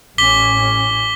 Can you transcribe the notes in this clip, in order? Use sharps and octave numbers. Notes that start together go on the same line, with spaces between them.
A1 C#4 D6 B6 G7